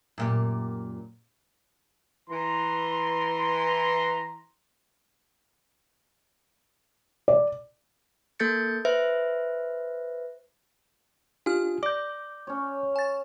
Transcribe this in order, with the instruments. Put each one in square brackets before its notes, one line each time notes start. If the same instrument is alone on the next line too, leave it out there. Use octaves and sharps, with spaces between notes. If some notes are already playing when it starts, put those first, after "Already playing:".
[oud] F#2 A#2 G4
[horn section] E3 A#5 C6
[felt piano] D5
[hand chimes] A#3 A4 G6 A6 C#7
B4 C5 E5
[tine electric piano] D4 F4 G#5 [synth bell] G4 F6
[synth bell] D5 [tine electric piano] D6 G6
[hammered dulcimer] C#4 C#5
[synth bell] G#5 A6